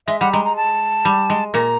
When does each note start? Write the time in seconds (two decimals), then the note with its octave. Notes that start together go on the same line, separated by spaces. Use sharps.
0.07 G#3 E5
0.20 G3 F#5
0.32 G#3 A#5
0.45 A#5
0.56 A5
1.05 G3
1.30 G#3
1.54 A#2 A#3 A#5